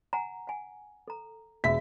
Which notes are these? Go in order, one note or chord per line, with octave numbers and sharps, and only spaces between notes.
F#5 G#5 A#5
F#5 G#5
A4 A#5
E1 F4 F#4 E5 B6